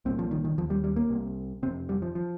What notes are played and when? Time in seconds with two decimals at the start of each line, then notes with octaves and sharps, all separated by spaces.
0.05 C2 A#2 C4
0.19 F3
0.31 D#3
0.44 D#3
0.57 D#2 F3
0.70 G3
0.84 G3
0.96 A#3
1.09 C2 C3
1.63 C3 C4
1.66 F2
1.89 G3
2.02 F3
2.15 F3